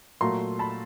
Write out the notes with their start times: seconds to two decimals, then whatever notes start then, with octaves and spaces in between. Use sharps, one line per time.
0.21 A#2 F#3 A3 A#5 C6
0.59 A5 B5